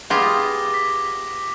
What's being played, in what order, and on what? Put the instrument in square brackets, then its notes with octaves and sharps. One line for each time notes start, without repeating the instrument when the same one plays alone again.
[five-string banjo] B3 G#4 [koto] F4 G4 [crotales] D6 A#6 G7
[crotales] B6